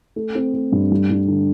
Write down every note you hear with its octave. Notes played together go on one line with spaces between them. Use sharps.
A3
C4
A3
G2
G3
G3
D3